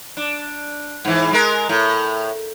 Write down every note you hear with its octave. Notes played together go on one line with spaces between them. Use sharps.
D4
G#2 E3
G#3 A#4
A2